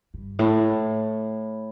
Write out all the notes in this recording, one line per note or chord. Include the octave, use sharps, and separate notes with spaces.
G2
A2